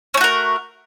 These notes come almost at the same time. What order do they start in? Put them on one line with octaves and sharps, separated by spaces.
C#4 A3 F#4 A#4